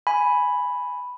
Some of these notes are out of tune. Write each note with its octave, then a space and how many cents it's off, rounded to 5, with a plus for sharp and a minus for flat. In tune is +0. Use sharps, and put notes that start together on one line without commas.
G#5 +0 B5 +0